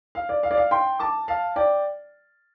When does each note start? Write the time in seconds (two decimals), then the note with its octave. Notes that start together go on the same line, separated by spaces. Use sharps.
0.15 F5
0.29 D5
0.43 F5
0.51 D5
0.57 F5
0.71 G5 C6
0.99 A5 D6
1.28 F5 A5
1.56 D5 G5